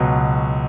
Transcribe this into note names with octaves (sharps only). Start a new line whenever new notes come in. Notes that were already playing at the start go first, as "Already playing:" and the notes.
Already playing: C#2 B2 F#3